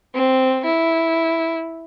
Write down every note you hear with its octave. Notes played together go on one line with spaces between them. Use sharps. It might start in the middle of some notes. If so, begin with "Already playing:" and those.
C4
E4